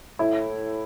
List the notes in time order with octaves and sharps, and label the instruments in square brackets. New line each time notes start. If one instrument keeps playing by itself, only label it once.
[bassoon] A2 [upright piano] E4